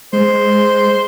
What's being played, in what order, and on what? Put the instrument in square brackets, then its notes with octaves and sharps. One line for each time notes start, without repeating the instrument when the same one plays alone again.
[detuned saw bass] G#3 [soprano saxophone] C5